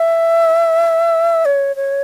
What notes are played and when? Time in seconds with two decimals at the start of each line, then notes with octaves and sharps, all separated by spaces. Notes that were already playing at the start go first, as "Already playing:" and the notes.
Already playing: E5
1.45 C#5
1.76 C#5